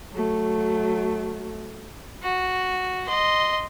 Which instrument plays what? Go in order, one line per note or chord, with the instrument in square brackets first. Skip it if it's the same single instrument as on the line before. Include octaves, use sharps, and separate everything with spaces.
[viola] F#3 A3
[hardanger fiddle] F#4
D#5 C6